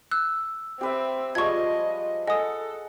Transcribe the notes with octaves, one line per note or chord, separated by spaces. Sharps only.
E6 F#6
C4 G4 B4 E5
F3 G3 G#3 D#5 C#6 G#6
A4 D#5 F#5 G#5 D#6